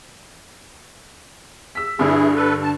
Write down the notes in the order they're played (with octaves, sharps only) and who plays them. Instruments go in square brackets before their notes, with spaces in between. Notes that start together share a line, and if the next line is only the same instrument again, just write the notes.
[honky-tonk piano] E6 B6
[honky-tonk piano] G2 D3 [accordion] E4 G#4
[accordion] A4 B4
A5